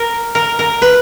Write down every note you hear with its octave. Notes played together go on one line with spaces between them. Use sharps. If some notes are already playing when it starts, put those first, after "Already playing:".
Already playing: A#4
A#4
A#4
B4